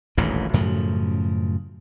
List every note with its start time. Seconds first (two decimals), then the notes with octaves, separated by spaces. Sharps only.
0.17 D#1 A1 D2 G#2
0.54 F#2 A2 C#3 F3